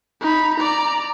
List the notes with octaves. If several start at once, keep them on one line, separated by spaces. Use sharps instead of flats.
D#4 B5
D5 A#5